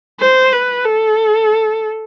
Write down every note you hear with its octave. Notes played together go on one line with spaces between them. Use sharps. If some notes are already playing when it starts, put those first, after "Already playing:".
C5
B4
A4